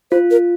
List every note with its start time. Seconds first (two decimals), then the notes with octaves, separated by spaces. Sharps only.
0.11 F4 C5
0.31 A#4